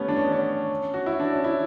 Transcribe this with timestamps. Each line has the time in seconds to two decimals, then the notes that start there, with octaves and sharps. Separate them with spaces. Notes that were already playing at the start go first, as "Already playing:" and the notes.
Already playing: G3 A3 B3 C#4
0.08 D4
0.16 C#4
0.24 B3
0.32 C#4
0.94 F#4
1.06 E4
1.20 D4
1.33 C#4
1.44 E4